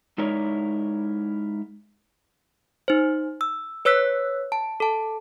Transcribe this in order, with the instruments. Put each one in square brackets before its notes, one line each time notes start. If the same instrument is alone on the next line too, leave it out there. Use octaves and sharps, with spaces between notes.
[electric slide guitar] G#3 D#4 E4 A#4 C#5 D5
[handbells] D#4 C5
E6
B4 C#5 E6 F#6 B6
A5
A4 A5